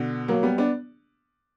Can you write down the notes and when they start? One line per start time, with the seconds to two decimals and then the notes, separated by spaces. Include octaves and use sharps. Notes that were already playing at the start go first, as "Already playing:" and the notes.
Already playing: B2 D3
0.28 F#3 A#3
0.43 G3 B3
0.58 B3 D4